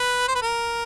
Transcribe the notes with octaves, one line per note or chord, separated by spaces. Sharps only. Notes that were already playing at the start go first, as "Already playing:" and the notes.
Already playing: B4
C5
B4
A#4